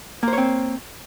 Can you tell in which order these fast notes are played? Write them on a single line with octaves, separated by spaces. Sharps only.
A#3 C5 C#5 C4